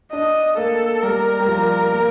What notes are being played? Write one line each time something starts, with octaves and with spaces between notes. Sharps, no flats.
D4 D#5
A#3 A4
G3 A#4
G3
F3
A#3